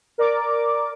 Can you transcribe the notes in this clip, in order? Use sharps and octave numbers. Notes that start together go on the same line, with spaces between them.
A#4 D5 D6